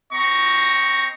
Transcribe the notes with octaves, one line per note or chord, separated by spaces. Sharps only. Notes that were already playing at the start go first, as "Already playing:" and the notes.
C4 D#5 A#5 C#6